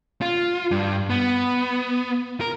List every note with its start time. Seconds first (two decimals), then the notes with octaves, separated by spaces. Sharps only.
0.22 F4
0.71 G2
1.10 B3
2.41 A#4